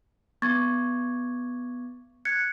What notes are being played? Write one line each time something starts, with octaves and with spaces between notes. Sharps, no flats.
B3 C#6 D6 G#6 A6
F#6 G#6 C#7